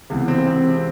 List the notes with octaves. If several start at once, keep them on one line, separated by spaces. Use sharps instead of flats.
C#2 C3 E3 B3
C4
C4